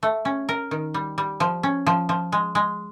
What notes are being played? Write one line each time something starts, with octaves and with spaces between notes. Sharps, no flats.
A3
C#4
A#4
D#3
G3
G3
F3
C#4
F3
F3
G#3
G#3